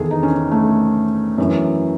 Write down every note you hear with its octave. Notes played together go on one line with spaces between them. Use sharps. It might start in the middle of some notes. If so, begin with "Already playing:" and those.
Already playing: E2 D#3 G#4 A4
D#4
C#4
A3
F#2 E3